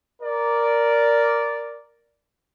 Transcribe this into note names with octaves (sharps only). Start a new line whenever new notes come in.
A#4 D5